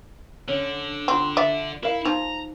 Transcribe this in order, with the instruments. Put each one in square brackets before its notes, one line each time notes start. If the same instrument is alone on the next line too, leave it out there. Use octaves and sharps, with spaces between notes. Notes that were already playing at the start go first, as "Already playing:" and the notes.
[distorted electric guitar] D3 [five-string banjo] C#4
[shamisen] C4 [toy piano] F4 F#5
[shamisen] D5 [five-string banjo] E5
[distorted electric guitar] E4 [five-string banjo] A#4 F5
[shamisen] F3 [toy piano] D#4 [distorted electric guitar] A#5